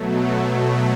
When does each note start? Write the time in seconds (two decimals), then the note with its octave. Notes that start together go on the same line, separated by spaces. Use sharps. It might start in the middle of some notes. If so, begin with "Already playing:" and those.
Already playing: B2 F#3 A3